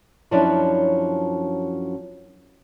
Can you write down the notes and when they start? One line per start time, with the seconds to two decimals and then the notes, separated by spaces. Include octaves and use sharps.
0.31 F#2 F3 F#3 C#4 D4 E4